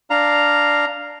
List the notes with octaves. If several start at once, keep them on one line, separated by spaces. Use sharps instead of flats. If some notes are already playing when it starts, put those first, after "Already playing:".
D4 F5 A#5